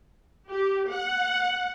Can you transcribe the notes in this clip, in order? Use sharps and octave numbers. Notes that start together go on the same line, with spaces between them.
G4
F#5